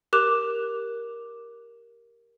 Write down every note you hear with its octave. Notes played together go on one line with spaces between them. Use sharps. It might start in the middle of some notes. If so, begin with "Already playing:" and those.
G4 A#4 D6 F#6 E7 F7